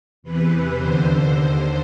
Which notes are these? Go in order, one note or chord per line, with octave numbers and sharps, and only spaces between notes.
E2 C3 E3 B4
D#2 D3 C5